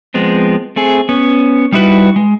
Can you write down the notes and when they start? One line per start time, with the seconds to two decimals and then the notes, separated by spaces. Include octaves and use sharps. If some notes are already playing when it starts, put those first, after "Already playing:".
0.14 F3 G#3 B3 C4
0.76 A3 C4 G#4
1.09 B3 C#4
1.72 G3 D#4 E4 F#4 B4
2.16 G#3